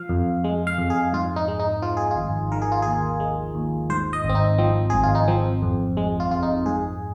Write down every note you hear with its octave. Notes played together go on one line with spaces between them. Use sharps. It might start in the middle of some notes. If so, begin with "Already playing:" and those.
Already playing: F3 F5
F2
G#3
F5
F2
G#4
G#2 F4
D#4
G#3
D#4
F3 F4
G#4
F4
G#1
D#3 A#4
G#4
F4
D#2 G#4
G#3
D#2
G#2 C5
D#5
G#1
C4
D#4
F3 C4
G#1 G#4
F4
D#4
F3 C4
F2
G#3
F4
F2 F4
D#4
G#2 G#4